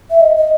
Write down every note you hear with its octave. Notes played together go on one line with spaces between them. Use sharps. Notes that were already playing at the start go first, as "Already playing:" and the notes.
E5
D#5
D#5